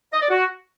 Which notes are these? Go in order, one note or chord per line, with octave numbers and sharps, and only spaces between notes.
D#5
D5
F#4